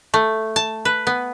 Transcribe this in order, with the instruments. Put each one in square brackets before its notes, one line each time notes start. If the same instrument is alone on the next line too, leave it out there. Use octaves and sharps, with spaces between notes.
[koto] A3
A5
B4
B3